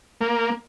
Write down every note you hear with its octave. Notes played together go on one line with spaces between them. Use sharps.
A#3